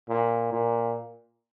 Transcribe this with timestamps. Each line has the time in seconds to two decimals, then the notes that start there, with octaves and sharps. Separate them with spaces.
0.09 A#2
0.52 A#2